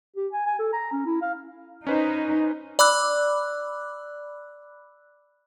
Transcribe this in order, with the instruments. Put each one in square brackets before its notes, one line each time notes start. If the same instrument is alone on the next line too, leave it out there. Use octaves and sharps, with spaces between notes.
[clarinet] G4
G#5
G#5
A4
A#5
C#4
E4
F5
[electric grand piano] C#4 B4 C5 [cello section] D#4
[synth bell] D5 B5 D6 E6 F#6